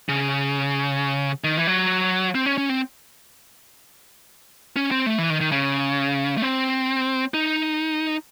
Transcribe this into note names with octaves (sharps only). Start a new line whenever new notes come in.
C#3
D#3
E3
F#3
C4
C#4
C#4
C4
C#4
C4
A3
E3
D#3
D#3
C#3
A3
C4
D#4